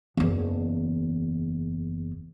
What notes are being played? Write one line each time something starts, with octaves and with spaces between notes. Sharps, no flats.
F#1 E2